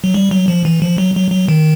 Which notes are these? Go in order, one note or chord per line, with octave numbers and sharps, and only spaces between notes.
F#3
G3
F#3
F3
E3
F3
F#3
F#3
F#3
D#3